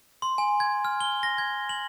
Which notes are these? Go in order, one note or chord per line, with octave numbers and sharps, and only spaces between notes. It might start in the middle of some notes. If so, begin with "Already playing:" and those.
C6
G#5
G#6
F6
G7
A#6
G#6
F#7